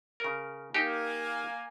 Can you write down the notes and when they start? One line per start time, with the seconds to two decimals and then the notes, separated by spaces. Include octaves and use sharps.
0.20 C#3 A#4
0.74 A#3 D#4 G4 G#5